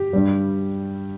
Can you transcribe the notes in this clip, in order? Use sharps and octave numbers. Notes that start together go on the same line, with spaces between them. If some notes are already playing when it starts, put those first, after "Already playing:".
Already playing: G4
G2 G3